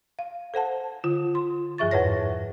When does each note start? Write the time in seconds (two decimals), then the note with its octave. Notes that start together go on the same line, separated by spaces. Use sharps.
0.19 F5
0.54 A4 C5 F#5 A5
1.04 D3 F4
1.35 C6
1.78 G2 F3 G#4 E5 C#6 A6
1.91 F2 G#2 B4 C#5 A#6